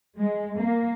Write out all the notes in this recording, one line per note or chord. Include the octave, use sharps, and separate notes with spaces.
G#3
A#3